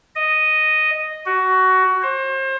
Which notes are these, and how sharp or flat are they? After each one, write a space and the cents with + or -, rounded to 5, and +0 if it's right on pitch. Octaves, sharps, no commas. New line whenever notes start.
D#5 -5
F#4 +15
C5 +35